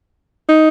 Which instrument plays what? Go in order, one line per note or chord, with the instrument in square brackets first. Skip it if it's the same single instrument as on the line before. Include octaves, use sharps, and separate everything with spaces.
[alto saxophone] D#4